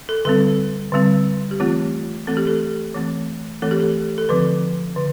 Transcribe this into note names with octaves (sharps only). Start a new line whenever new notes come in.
A4
D3 G3 C4 A4
D3 G3 C4
G4
E3 A3 C4 F4
E3 A3 C4 A4
G4
A4
E3 A3 C4
E3 A3 C4 A4
G4
A4
A4
D3 F3 C4 B4
D3